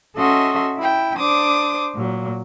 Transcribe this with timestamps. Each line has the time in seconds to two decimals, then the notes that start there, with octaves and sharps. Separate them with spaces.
0.18 C#4 F#4 A4 D#5 E5 C6
0.77 E4 G5
1.18 D4 C5 D6 D#6
1.95 A#2 F#3